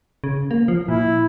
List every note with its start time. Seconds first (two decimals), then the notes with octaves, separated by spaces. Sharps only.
0.24 C#3
0.51 A#3
0.68 F3
0.88 A#2 E4